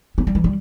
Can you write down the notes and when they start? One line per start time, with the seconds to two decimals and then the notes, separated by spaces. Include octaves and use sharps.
0.18 B3
0.27 G3
0.35 E3
0.44 G3